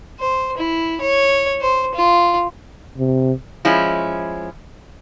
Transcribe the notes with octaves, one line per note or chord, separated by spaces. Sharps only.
C5
E4
C#5
C5
F4
C3
F3 G#3 C#4 E4